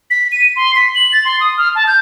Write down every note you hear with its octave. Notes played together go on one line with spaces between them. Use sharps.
B6
D#7
C6
B6
F#7
A6
C6
D#6
F6
A5
G6